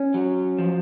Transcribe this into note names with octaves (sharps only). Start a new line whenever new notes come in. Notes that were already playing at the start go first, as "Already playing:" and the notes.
Already playing: C#4
F#3
F3